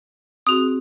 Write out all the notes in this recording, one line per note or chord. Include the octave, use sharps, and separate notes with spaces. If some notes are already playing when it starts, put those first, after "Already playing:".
C4 F#4 G#4 D#6 F7